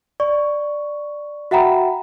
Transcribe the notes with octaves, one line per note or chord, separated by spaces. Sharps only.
D5 C#6
F#4 E5 F#5 G5 A#5 B5